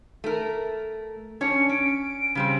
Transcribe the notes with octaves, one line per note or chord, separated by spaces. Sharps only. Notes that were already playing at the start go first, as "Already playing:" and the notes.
A3 A#4
C#4 D4 C#5 C#7
C#4 D7
C#3 G3 C4